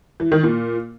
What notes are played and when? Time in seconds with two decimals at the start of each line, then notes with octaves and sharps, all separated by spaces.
0.20 E3
0.32 D#3
0.43 A#2